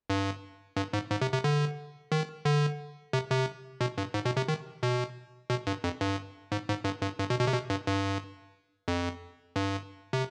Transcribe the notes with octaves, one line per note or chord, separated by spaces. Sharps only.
G2
G2
G#2
G#2
C3
C3
D3
D#3
D3
C3
C3
B2
G2
G#2
B2
C3
D#3
B2
B2
G2
F2
G2
G#2
G#2
G2
G2
G2
B2
B2
C3
B2
G2
G2
F2
G2
C3